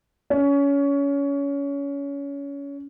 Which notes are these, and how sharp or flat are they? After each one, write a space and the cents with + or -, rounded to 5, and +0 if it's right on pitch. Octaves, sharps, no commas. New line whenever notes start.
C#4 +25